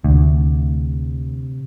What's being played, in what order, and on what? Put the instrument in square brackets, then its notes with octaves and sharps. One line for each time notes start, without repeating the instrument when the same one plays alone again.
[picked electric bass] D2 [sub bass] C3